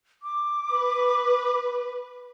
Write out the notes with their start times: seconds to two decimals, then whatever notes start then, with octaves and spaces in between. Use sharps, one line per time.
0.23 D6
0.72 B4